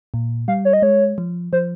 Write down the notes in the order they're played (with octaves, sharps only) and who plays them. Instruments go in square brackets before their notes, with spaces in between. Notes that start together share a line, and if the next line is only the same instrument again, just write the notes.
[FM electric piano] A#2
[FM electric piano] G3 [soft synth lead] F5
[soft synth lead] C#5
D#5
[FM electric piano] G#3 [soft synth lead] C#5
[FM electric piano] F3
[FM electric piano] F3 [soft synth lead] C5